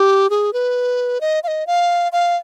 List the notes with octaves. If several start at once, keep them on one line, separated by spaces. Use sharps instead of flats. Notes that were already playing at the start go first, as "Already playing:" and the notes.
Already playing: G4
G#4
B4
D#5
F5
D#5
F5
F5